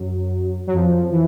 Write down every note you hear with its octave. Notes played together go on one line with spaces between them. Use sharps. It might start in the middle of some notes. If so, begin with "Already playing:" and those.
Already playing: F#2 F#3
F#3
F2 F3
E3